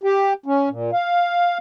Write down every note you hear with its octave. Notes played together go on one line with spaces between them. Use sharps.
G4
C#4
A#2
F5